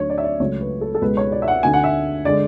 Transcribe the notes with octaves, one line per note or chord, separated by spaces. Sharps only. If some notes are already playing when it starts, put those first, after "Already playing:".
Already playing: D2 D3 F#3 C#5
D5
E5
D5
C#2 C#3 F#3 A3 C#5
B4
A4
A4
C#2 B2 G#3 B4
C#5
D5
E5
F#5
D2 D3 A3 G#5
F#5
E5
D3 G#3 D5